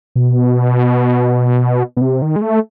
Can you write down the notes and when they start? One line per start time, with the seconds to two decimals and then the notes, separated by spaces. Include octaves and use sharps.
0.16 B2
1.97 B2
2.01 C3
2.22 D#3
2.36 G#3
2.41 A3